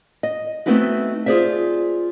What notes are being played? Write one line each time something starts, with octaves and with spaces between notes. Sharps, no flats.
D#5
A3 B3 C4 D#4 E4 F#4
F4 G#4 A4 C5 D5 E5